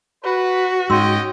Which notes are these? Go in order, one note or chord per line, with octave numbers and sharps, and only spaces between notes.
F#4 B4
G#2 C#4 D#5 G5 C6 E6